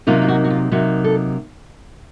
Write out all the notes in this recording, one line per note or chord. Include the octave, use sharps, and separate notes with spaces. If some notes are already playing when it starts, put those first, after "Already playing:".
C3 F#3 A#3 D#4 F4
F4
F#4
F#4
F4
C3 F#3 A#3 D#4 F#4
A4